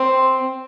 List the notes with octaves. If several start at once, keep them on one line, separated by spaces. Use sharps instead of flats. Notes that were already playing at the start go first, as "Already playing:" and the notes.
Already playing: C4